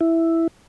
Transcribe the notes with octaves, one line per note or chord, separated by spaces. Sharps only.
E4